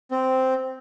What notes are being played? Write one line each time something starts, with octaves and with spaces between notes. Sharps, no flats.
C4